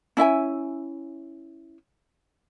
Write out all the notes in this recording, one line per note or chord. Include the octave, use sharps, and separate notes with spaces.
C#4 E4 E5 G#5